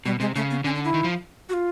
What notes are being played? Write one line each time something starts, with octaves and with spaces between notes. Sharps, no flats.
B2 G3
C3 G#3
C#3 A3
B3
D3 C#4
D4
E4
D#3
F3
F#4
F4